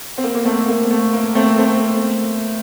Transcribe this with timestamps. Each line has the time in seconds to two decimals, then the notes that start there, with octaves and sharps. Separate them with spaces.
0.18 C4
0.24 A#3
0.35 A#3
0.45 A3 C4
0.68 A#3
0.91 A3
1.13 A#3
1.35 A3 C4
1.58 A3 C4